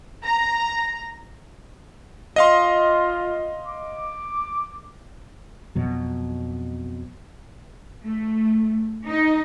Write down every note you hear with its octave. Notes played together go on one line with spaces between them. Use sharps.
A#5
F4 D#5 F5 C6
D6
F2 B2 F#3
A3
D#4